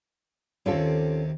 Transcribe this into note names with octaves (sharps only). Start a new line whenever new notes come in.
D#2 C3 C#4 F4 A4